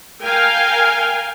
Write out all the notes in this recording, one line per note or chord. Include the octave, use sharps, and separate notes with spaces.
A#4 F5 G5 G#5